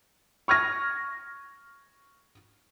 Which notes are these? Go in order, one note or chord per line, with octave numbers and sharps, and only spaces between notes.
C#6 F6 G#6 A#6